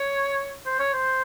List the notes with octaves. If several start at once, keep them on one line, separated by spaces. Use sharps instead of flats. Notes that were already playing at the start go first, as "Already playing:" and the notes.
Already playing: C#5
C5
C#5
C5